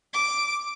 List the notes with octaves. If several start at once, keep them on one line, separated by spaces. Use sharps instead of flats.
D6